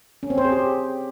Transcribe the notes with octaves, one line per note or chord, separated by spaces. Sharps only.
C#4
C4
C5
G#4
G4